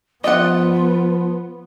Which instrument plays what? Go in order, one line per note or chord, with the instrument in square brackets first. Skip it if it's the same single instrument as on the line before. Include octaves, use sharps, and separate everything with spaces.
[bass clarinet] F3 [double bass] B3 [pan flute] F4 [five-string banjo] D#5 F#5